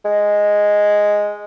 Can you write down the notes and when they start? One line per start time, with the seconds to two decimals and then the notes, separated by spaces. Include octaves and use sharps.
0.05 G#3